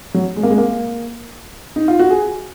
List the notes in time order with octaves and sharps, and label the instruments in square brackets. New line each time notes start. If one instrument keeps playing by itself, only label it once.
[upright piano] F#3
G#3
A#3
G#3
A#3
D#4
F4
F#4
G#4